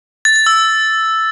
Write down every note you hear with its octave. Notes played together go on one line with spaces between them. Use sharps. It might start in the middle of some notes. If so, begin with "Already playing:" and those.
A6
A6
E6